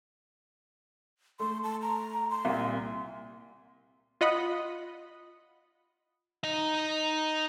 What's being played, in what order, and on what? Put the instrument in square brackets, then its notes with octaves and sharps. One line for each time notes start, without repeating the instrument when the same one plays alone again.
[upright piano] A3 [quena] C6
[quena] A5
A#5
C6
[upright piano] C2 A#2
[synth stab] F4 D#5 F#5 B5
[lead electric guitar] D#4 D#5